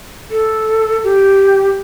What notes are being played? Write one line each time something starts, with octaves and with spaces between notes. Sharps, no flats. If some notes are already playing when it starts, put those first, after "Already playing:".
A4
G4